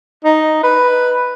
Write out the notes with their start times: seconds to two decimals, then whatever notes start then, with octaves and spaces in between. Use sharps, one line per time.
0.25 D#4
0.63 B4